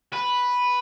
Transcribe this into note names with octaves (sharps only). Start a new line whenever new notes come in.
B4